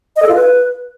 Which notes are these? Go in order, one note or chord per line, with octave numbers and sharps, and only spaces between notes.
D#5
A4
F4
B4